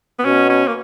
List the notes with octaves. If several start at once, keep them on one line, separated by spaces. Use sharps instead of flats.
B3
B2 C#4
C#4
A#3